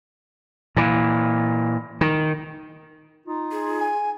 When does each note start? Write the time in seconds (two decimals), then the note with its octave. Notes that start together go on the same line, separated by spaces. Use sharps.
0.76 A#2 E3
2.01 D#3
3.26 D#4 F4
3.52 G#4
3.80 G#5